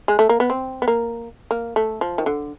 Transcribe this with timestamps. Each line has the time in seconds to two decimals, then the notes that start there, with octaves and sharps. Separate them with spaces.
0.08 G#3
0.19 A3
0.29 A#3
0.40 B3
0.50 C4
0.82 B3
0.88 A#3
1.51 A#3
1.76 A3
2.01 F3
2.18 D#3
2.26 D3